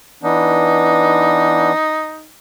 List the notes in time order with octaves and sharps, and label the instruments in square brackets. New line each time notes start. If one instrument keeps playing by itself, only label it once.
[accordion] E3 B3 D4 [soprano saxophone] D#4